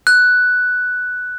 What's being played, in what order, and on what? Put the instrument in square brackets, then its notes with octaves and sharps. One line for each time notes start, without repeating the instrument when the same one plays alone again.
[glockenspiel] F#6